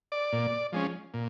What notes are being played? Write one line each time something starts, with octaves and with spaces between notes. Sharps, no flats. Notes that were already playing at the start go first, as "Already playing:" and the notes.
D5
A#2
F3 G#3 C#4
A#2